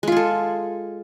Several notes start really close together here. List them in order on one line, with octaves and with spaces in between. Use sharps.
G#3 F4 G#4 A4